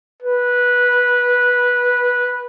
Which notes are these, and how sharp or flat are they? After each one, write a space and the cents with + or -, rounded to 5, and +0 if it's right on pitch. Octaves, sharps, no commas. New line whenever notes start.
B4 -15